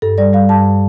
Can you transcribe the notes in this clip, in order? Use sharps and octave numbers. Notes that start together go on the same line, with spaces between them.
G2 A4
G3 D5
G3 F5
G2 A5